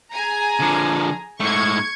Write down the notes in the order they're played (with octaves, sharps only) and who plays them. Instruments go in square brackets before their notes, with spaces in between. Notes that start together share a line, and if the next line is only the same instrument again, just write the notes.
[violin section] G#4 G#5 A#5
[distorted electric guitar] D3 F3
[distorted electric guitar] G#2 A3 [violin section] C#6 G#6